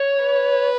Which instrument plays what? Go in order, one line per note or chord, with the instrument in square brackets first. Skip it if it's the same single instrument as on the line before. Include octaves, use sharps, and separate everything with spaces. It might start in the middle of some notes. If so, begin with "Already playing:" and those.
Already playing: [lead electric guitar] C#5
[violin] B4